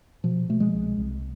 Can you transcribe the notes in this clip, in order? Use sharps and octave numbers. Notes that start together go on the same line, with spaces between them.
B2 F3
B2 A3
G#3
C2
C2